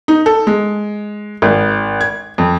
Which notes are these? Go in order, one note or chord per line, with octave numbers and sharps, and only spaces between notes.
D#4
A4
G#3
G#1
G#6
F2